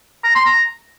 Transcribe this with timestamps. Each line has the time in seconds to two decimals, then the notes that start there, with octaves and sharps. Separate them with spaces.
0.24 A#5
0.35 C6
0.46 A#5